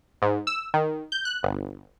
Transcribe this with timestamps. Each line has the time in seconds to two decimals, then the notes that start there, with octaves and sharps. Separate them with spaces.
0.22 G#2
0.47 E6
0.74 D#3
1.12 G6
1.25 F#6
1.43 G1